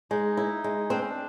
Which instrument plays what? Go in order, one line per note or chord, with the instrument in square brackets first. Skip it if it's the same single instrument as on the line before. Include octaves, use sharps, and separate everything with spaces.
[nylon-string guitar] G#3 [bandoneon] D#4
[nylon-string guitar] E4
G#3
[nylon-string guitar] C4 [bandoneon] D4
[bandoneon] C#4
D4